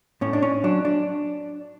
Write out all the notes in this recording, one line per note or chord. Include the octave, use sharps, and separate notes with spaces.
A2 C#4
D4
C#4
F#3 D4
D4